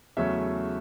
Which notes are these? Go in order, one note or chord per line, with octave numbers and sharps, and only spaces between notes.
E2 C#3 F#3 A3 C#4 E5